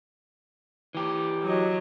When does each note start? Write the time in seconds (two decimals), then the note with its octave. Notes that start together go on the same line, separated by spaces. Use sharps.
0.95 E3 G4
1.43 F#3 D#5